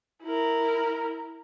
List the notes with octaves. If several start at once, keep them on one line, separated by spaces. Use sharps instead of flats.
E4 A#4